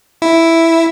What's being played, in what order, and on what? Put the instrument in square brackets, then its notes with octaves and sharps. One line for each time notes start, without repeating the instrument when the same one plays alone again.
[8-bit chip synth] E4